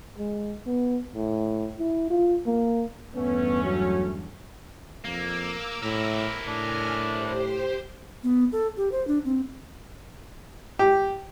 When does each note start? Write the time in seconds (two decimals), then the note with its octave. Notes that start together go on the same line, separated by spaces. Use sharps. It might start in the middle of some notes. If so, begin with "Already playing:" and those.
0.19 G#3
0.67 B3
1.15 A2
1.79 E4
2.10 F4
2.46 A#3
3.15 E2 G2 A3 B3 C#4
3.64 F#3
5.04 F2 A#3 D6 E6
5.82 A2 E4 A#4
6.48 A2 D4 G#5 F6
7.09 G4 C5
8.24 B3
8.52 A4
8.77 G4
8.92 C5
9.07 D4
9.25 C4
10.79 G4